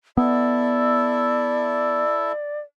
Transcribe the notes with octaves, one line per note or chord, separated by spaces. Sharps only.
B3 E4 A4 D5 E5